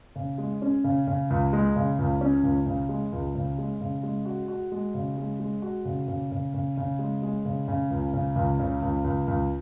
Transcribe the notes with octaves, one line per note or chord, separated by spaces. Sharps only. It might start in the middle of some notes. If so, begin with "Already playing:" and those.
C#3
G#3
C#4
C#3
C#3
C#2
G#3
C#3
C#2
C#4
C#2
C#3
G#3
C#2
C#3
G#3
C#3
G#3
F#4
F#4
G#3
C#3
G#3
G#3
F#4
C#3
C#3
C#3
C#3
C#3
G#3
G#3
C#3
C#3
C#2
C#3
C#2
C#3
C#2
C#2
C#2